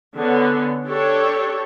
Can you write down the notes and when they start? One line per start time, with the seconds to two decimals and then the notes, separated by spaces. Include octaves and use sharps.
0.16 D3 B3 C#4
0.86 D4 G4 A4 C#5